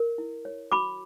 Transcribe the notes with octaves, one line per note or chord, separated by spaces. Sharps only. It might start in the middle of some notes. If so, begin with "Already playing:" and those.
Already playing: A#4
E4
C#5
F#4 B5 D6